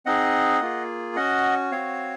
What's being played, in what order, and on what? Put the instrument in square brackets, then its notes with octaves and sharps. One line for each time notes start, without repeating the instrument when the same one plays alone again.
[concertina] C4 D#4 G#4 D#5 F#5
A#3 F4 G#4
C#4 F#4 D#5 F#5
C4 F#4 C#5 F5